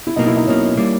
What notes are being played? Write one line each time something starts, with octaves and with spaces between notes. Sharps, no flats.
E4
B1 B2 A#3 D#4
E4
D#4
B1 B2 A#3 C#4
G3 A#3